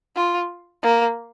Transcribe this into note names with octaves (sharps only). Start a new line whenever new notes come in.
F4
A#3